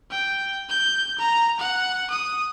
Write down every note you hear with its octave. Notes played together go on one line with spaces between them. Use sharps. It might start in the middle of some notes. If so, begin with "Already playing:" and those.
G5
G6
A#5
F#5
D#6